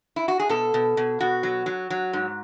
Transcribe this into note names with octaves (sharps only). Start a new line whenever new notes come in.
E4
F#4
G#4
B2 A4
B2
B2
B2 F#4
F#3
F#3
F#3
G#2